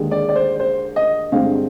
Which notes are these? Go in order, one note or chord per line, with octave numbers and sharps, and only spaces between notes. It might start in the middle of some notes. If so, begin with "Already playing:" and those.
Already playing: D#2 D3 G#3
D5
D5
C5
C5
D#5
G2 D3 G#3 C4 F5